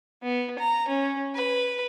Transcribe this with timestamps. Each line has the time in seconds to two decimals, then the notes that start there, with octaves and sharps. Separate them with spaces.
0.23 B3
0.59 A#5
0.88 C#4
1.34 B4